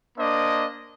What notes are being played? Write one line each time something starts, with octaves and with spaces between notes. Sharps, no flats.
A#3 D4 C5 D#5